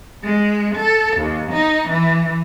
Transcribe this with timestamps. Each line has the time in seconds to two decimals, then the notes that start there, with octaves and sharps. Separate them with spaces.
0.24 G#3
0.75 A4
1.17 D#2
1.52 D#4
1.89 E3